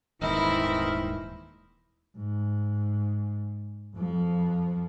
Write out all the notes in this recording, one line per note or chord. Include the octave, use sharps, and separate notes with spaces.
D#1 D#2 G#2 E3 C4 E4 A#4 D#5
G#2
F2 F3